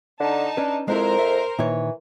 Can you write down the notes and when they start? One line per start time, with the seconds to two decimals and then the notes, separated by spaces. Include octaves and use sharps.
0.20 D3 D#4 A5
0.57 C#4 D4 B4
0.88 F2 G#3 C4 E4 A#4 C5
1.19 E5
1.59 A#2 D#3 E3 C#5